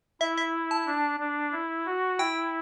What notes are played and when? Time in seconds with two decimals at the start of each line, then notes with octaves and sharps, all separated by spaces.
0.21 E4 E5
0.38 E5
0.71 A5
0.86 D4
1.20 D4
1.52 E4
1.86 F#4
2.18 E4 G5